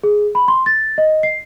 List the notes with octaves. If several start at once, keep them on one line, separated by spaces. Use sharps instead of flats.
G#4
B5
C6
A6
D#5
C7